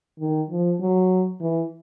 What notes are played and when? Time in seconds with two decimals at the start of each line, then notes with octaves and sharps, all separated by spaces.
0.20 D#3
0.50 F3
0.80 F#3
1.41 E3